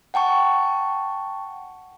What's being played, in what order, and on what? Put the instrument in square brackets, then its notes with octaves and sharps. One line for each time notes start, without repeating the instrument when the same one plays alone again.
[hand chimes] F#5 G5 A5 C#6